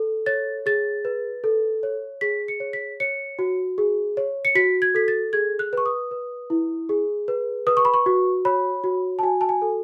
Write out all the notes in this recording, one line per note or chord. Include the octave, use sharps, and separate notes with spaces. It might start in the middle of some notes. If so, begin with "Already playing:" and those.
Already playing: A4
C#5 A6
G#4 A6
B4
A4
C#5
G#4 B6
C#7
C#5
B6
C#5 C#7
F#4
G#4
C#5
C#7
F#4 B6
G#6
A4 B6
A6
G#4 G#6
F#6
B4 C#6
D#6
B4
E4
G#4
B4
B4 D#6
C#6
B5
C#6
F#4
C#5 B5
F#4
A5
F#4 G#5
A5
G#5
A4